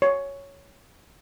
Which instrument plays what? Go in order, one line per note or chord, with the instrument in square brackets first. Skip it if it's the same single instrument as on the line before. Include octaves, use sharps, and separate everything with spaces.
[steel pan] C#5